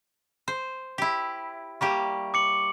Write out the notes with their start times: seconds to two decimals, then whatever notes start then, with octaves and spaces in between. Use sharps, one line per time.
0.48 C5
0.98 E4 G4
1.81 G3 A#3 G4 C#6
2.34 D6 C#7 F#7